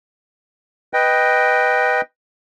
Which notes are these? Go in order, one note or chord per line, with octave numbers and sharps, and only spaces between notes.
B4 D#5 G5